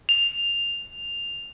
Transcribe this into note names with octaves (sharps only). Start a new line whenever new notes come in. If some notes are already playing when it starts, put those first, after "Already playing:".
F7